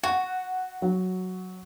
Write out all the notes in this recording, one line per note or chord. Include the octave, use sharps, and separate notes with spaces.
F#4 F#5
F#3